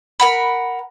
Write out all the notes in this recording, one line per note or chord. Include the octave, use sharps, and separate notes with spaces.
A#4 F#5 B5